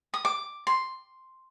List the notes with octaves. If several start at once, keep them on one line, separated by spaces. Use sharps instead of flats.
D#6
D6
C6